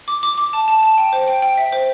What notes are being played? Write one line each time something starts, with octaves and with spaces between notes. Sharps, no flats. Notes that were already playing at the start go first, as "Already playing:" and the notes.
D6
D6
D6
A5
A5
A5
G5
C5
G5
G5
E5
C5